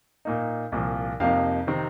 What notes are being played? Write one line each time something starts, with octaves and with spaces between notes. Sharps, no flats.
A#2 A#3 D#4
C2 A#2 F3
F2 C3 F3 A#3 D#4 F5
C3 D#3 C4